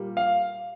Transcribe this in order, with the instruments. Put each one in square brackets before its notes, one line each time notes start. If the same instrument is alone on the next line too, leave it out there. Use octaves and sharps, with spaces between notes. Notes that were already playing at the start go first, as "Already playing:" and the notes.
Already playing: [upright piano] A#2 G3 A#3
[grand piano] F5